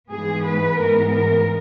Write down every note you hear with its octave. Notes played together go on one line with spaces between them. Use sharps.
G#2 E3 G#3 B3 G#4
B4
G#2 E3 G#3 B3 A#4
A#4